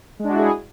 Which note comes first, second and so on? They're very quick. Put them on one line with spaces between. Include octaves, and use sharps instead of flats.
G#3 D4 F#4 E4 G#4